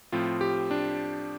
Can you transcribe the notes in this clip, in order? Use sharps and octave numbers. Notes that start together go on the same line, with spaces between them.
A2 F3 C4 F4
G4
D4